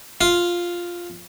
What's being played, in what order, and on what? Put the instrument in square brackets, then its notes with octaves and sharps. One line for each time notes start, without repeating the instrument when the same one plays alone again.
[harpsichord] F4